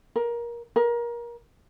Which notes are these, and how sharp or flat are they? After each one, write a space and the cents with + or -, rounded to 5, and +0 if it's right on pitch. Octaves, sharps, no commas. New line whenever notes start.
A#4 +20
A#4 +25